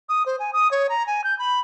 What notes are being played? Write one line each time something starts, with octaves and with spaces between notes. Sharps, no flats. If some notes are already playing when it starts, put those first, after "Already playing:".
D#6
C5
G#5
D#6
C#5
A#5
G#5
G6
B5